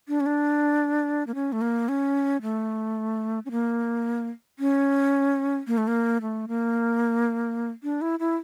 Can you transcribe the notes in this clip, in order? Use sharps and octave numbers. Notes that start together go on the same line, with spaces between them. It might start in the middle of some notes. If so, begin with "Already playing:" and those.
D4
C#4
D4
A#3
C#4
A3
A#3
C#4
A3
C#4
A#3
C#4
A#3
A3
A#3
A3
A#3
D4
E4
E4